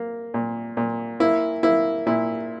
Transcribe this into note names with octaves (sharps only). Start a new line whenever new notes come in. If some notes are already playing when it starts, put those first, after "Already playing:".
Already playing: A#3
A#2
A#2
A#3 E4
A#3 E4
A#2 E4